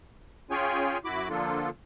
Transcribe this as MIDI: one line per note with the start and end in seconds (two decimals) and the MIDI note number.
0.51 0.98 61
0.51 0.98 65
0.51 0.98 68
0.51 0.98 73
0.51 0.98 79
0.51 0.98 80
1.05 1.28 42
1.05 1.28 64
1.05 1.28 66
1.05 1.28 83
1.05 1.28 86
1.30 1.70 50
1.30 1.70 53
1.30 1.70 58
1.30 1.70 62
1.30 1.70 65
1.30 1.70 69